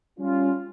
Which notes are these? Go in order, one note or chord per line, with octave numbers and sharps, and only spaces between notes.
G3 C#4 F4